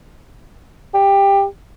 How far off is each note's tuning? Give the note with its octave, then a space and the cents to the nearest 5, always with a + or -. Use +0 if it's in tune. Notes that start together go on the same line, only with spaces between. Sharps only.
G4 +15